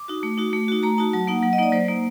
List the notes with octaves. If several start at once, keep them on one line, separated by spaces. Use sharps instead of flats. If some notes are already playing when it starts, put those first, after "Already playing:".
Already playing: D6
D#4 F#4
A3
D#4 F#4
A3
D#4 F#4
A3 A#5
D#4 F#4 A5
F#3 A5
A#3 D#4 F#5
F#3 F#5
D#5
A#3 D#4 D5
F#3 C5
A#3 D#4